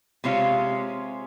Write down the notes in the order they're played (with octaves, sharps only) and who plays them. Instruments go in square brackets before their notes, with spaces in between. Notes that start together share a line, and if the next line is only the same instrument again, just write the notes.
[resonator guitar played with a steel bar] C3 G#3 C#4 F4 F5